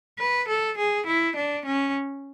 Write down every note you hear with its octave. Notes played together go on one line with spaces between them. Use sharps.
B4
A4
G#4
E4
D4
C#4